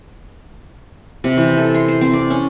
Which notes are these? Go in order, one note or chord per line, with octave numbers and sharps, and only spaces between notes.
C3
E3
A4
C6
C5
C4
D5
C#4